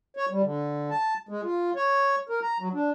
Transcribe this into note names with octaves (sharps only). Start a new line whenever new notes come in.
C#5
G3
D3
A5
G#3
F4
C#5
A#4
A#5
F#3
D4